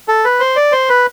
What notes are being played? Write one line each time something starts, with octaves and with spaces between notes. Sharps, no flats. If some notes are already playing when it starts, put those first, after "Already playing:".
A4
B4
C5
D5
C5
B4